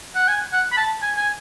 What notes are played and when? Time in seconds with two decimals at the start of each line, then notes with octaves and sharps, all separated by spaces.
0.15 F#5
0.28 G#5
0.53 F#5
0.72 B5
0.77 A5
1.02 G#5
1.17 G#5